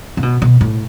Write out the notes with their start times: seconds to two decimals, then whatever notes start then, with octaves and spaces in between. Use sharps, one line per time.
0.17 C3
0.23 B2
0.42 B2
0.61 A2